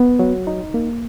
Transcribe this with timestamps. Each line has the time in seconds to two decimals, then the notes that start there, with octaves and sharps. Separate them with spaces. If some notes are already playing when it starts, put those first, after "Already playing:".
Already playing: B3
0.19 F#3
0.47 D#4
0.74 A#3